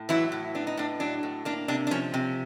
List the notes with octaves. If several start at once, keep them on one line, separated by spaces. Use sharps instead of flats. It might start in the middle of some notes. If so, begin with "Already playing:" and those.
Already playing: A2
E3 F#3 E4
A2
B3 D4
D#4
A2 D4
F#3 D4
A2
A#3 D4
C3 D4
D4
F3 C#4
C3